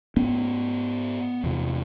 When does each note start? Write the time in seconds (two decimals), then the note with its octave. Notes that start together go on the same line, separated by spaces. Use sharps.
0.17 G#2 B3 C#4
1.44 E2 C3